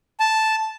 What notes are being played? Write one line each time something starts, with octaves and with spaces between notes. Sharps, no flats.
A5